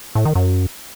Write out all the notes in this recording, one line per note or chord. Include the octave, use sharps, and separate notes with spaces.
A2
D#3
F#2